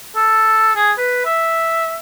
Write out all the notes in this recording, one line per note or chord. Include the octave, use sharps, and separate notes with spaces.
A4
G#4
B4
E5